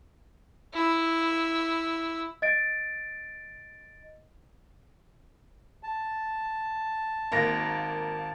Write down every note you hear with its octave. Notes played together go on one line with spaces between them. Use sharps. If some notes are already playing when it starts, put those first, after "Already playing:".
E4 E6
D#5 A6 D7
A5
G#1 A#3 A#6